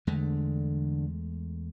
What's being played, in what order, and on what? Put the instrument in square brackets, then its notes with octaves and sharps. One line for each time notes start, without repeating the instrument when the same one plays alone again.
[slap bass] E2 G#3 A3 [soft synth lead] D3